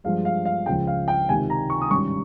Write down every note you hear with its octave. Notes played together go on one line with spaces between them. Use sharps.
G2 F3 G#3 F5
F5
F5
C#2 C#3 F3 G#3 G5
F5
G5
C#2 C3 D#3 G#5
A#5
C#6
D#6
G#1 G2 G3 C#4 C#6